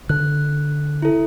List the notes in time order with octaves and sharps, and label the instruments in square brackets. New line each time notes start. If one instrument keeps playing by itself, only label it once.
[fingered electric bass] D3 [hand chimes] F#6
[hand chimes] E4 A4